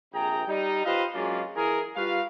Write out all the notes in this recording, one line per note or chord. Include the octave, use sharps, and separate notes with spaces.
A#1 C3 G#4 G5 A#5
G3 D#4
F4 G4 B4 C5 D#5 F5
F#3 G#3 A#3 C#4 D4 F4
E3 G#4 A#4
G3 F4 F#4 B4 F5